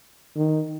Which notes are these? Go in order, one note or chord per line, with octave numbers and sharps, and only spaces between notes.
D#3